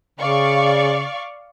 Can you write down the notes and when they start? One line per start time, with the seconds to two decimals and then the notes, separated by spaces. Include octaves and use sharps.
0.19 C#3 D5 F5 C#6